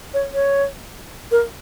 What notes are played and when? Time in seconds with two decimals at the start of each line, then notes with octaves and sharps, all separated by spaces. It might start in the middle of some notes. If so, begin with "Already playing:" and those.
0.14 C#5
0.34 C#5
1.31 A#4